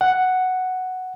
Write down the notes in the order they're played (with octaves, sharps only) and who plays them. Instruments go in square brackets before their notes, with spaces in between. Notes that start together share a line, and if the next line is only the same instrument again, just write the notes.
[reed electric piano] F#5